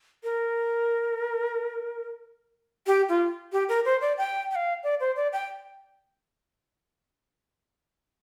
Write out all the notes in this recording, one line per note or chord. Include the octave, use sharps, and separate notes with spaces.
A#4
G4
F4
G4
A#4
C5
D5
G5
G5
F5
D5
C5
D5
G5